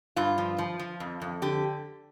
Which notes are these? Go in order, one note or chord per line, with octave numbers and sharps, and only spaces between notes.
G2 F4
F3
F3
F3
F2
F2
D3 G4